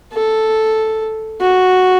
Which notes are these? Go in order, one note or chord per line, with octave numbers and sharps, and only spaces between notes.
A4
F#4